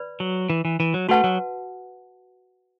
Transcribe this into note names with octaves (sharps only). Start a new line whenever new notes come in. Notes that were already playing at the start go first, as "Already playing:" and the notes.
Already playing: B4 D5 B5
F#3
E3
E3
E3
F#3
A3 F#4 B4 F#5 A5
F#3